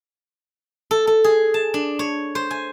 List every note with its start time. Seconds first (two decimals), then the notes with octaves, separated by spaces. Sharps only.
0.91 A4
1.07 A4
1.24 G#4
1.54 A5
1.74 D4
1.99 C#5
2.35 C5
2.51 G#5